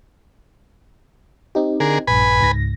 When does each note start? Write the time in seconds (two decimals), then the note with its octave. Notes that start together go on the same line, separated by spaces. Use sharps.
1.55 C4 D#4 G4
1.80 D3 G#4 A#4
2.07 A#1 G2 B4 G#5 B5
2.41 C#2 G#2 A#6